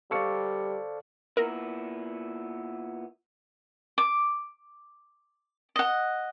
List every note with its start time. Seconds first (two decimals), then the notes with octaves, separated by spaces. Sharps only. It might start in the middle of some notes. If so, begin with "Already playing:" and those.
0.11 G3 A4 C5 D5 F5 C#6 C#7
1.37 A#2 B3 E4 A#4
3.98 D6
5.76 D#5 F#5